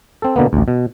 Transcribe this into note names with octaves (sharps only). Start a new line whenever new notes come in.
C4 A4
B2 D3 A#3 B3
A1 D2
B2